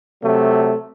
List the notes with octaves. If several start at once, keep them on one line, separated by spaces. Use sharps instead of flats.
C3 F#3 A3